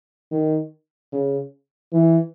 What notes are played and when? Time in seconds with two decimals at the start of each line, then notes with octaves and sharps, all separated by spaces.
0.31 D#3
1.12 C#3
1.92 E3